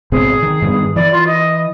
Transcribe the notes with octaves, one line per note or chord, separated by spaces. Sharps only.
G#1 B2 C4 G#4
D#3
G2 D#3 B3
E3 D5
F4
D#5